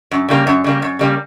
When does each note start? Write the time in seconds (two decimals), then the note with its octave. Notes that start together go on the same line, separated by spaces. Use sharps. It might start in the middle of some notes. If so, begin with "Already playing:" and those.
0.11 F#2
0.29 C#3 G3 A#3
0.47 F#2
0.64 C#3 G3 A#3
0.82 F#2
0.99 C#3 G3 A#3